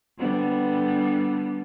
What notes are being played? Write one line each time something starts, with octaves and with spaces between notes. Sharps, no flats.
D3 G3 B3